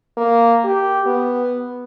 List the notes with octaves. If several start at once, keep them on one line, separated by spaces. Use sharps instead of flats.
A#3
G4
B3